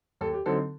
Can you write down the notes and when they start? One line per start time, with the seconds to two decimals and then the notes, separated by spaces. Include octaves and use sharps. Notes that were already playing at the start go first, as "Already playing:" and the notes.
0.21 D#2 A4
0.33 G4
0.46 D3 F#3 C4 D#4 A4